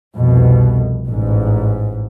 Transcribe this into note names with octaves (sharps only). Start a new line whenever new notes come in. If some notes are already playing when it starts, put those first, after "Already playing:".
C2 F2 B2
A1 G#2